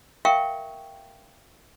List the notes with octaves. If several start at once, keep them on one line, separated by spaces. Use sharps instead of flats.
A#4 E5 F5 G5 C#6